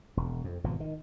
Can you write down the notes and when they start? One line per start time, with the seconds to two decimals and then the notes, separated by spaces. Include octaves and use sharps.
0.17 E1
0.44 F2
0.64 G#1 B2 F3
0.80 D#3